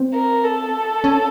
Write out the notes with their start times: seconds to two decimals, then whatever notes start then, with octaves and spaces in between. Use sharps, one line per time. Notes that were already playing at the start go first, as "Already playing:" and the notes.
Already playing: C4
0.13 A#4
0.44 A4
1.04 C#4